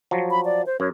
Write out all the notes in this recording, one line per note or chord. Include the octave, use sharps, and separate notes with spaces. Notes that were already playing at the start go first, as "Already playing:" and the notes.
F3 F#3
B5
D5
C5
F#2 C#5